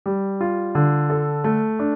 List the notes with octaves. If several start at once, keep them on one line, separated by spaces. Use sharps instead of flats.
G3
F4
D3
A4
A3
D4